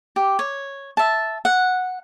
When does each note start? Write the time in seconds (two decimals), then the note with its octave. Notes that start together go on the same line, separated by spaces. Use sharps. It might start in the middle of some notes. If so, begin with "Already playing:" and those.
0.16 G4
0.39 C#5
0.97 E5 A5
1.45 F#5